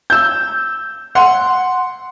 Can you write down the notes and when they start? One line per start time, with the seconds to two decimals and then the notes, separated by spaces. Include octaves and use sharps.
0.10 E6 G6
1.15 F#5 C6